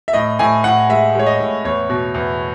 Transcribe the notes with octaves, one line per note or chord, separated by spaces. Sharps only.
E5
A2 D#5
A2 G#5
A2 F#5
G#3 E5
G#3 C#5
D#5
A2
E2 C#5
B2
E2